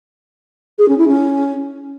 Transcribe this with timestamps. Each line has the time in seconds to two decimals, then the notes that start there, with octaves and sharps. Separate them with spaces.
0.78 G#4
0.88 C#4
0.98 E4
1.08 C#4